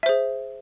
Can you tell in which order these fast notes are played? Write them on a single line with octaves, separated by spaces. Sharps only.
E5 C5 G#4